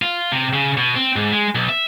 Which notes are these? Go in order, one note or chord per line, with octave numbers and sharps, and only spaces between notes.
F4
C3
C#3
B2
C4
G#2
G#3
B1
E5